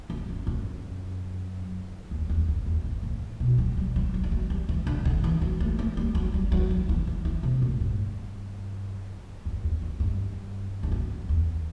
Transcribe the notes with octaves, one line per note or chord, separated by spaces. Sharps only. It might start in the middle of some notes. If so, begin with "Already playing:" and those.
F#2
F#2
F#2
E2
E2
F#2
E2
F#2
A2
B2
F#3
G3
F#3
E3
G3
F#3
G3
E3
D3
D3
E3
F#3
A3
A3
G3
F#3
G3
F#3
E3
E3
F#3
E3
C3
A2
G2
F#2
E2
F#2
G2
G2
F#2
E2